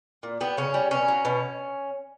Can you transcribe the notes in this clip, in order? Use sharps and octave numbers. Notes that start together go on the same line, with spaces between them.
A#2
G3 B3
C#3 C#4
G3
B2 C#4
F#3
B2